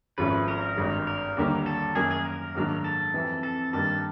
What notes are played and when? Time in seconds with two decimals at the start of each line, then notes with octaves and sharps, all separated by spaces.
0.18 G#1 G#2 F3 A3 C#4 B4
0.48 A#4
0.77 G#1 G2 D#3 G#3
1.07 A#4
1.37 D#2 D3 G3 A#3 D#4
1.66 A4
1.95 F#2 D#3 F#3 A#3 G#4
2.11 G#4
2.25 A#4
2.55 G#2 D#3 F#3 A#3 D4
2.84 A4
3.14 F2 C3 E3
3.43 A4
3.73 G2 D#3 G3 A#3 A4